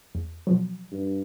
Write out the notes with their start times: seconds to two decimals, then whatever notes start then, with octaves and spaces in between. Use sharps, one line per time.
0.15 E2
0.47 B2 F3 F#3
0.91 G2